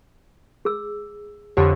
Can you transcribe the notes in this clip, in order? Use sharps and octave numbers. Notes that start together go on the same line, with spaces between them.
G#4 E6
F2 D3 G4 C#5